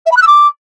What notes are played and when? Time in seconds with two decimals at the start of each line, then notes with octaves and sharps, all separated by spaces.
0.06 E5
0.11 B5
0.16 F#6
0.22 E6
0.27 D6